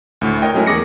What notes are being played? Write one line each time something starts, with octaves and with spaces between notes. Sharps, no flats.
D2 A2
A#4 C#5 D#5 G5
F#3 G#3 A3 C#4 E4 A#4
E2 G#4 D6 A#6 C#7